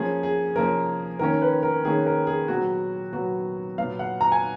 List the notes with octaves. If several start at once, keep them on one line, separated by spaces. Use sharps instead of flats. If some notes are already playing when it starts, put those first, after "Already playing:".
Already playing: F3 A#3 C#4 G#4
G#4
F3 A#3 C#4 A#4
D#3 A#3 C#4 A#4
B4
A#4
D#3 A#3 C#4 G#4
A#4
G#4
A#2 F#3 B3 F#4
A#2 F#3 B3 F#4
A#2 F#3 B3 F5
F#5
A#5
G#5